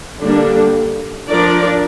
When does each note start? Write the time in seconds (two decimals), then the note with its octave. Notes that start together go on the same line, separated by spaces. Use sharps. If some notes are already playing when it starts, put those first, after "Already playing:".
0.21 D3 G3 A#3 D4
1.30 F3 D4 A#4 D5